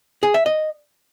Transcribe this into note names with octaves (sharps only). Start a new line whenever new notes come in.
G#4
E5
D#5